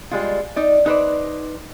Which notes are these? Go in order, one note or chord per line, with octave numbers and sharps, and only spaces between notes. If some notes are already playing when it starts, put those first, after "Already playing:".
G3 G#3 F4
D#4 D5
D#4 B4 C5 D5